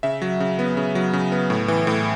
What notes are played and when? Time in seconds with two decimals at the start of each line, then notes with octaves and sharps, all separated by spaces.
0.03 C#3 E5
0.22 F#3
0.40 C#3
0.59 B3
0.77 C#3
0.95 F#3
1.13 C#3
1.32 B3
1.50 A2
1.68 E3
1.87 A2